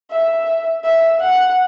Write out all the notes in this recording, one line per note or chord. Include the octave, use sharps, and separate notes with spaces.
E5
E5
F#5